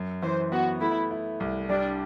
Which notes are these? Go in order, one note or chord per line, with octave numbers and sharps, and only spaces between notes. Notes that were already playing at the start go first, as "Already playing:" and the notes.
Already playing: F#2
E3 C5
B3 F#4
A3 E4
E4
C2
G3 D4